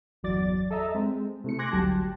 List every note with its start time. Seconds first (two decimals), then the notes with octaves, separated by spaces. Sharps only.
0.23 G1 E2 F#3 D5 A6
0.71 A4 D#5 E5 A#5
0.94 G#3 C4
1.44 C3 A3 E4 C#7
1.58 G#5 C6 D6 F#6 G#6 A#6
1.72 G#1 D2 F#3 G3 G4 A5